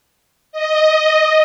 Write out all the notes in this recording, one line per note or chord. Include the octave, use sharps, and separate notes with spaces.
D#5
D#5